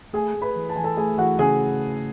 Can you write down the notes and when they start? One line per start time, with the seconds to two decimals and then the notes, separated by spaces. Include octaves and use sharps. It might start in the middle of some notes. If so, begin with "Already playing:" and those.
0.13 A3 G#4 G#5
0.34 A3
0.42 B4 B5
0.55 E3
0.69 A5
0.76 E3 G#5
0.84 A4 A5
0.97 A3 G#4 G#5
1.18 E3 F#4 F#5
1.39 C#3 G#4 G#5